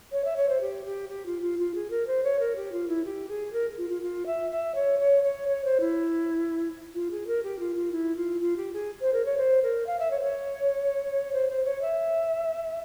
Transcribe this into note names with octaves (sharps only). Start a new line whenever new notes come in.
C#5
E5
C#5
C5
G4
G4
G4
F4
F4
F4
G#4
A#4
C5
C#5
A#4
G4
F4
E4
G4
G#4
A#4
F4
F4
F4
E5
E5
C#5
C#5
C#5
C#5
C5
E4
F4
G#4
A#4
G4
F4
F4
E4
F4
F4
G4
G#4
C5
A#4
C#5
C5
A#4
F5
E5
C#5
C5
C#5
C5
C5
C#5
E5